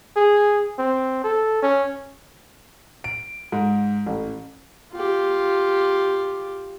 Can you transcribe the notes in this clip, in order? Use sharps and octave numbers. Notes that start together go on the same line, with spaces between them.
G#4
C4
A4
C#4
D7
G#2
A1
F4 G4